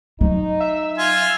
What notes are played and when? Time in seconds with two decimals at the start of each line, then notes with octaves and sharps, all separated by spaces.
0.21 F#3 D#4
0.60 E5
0.98 F4 G#5